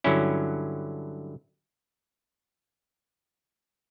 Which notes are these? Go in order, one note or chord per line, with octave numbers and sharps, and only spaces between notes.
G2 D3 F#3 C#4 E4